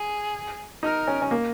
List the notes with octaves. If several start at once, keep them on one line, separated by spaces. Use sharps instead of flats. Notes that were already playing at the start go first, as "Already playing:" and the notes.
Already playing: G#4
D#4 A#4
C#4
C#4
A#3